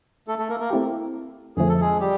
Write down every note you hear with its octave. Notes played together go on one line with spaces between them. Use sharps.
A3 A4
A3 A4
A#3 A#4
A#3 A#4
A3 C4 E4 G4
F2 D3 F3 A3 G#4
A4
G#3 G#4
G3 G4